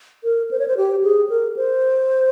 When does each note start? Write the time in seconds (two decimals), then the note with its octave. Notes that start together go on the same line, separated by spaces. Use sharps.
0.24 A#4
0.51 C5
0.59 C#5
0.68 C5
0.77 G4
1.03 G#4
1.30 A#4
1.56 C5